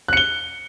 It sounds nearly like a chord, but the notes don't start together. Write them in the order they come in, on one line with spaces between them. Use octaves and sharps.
F#6 C#7 G7